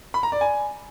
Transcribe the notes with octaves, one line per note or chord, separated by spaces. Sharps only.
B5
A#5
D5
G#5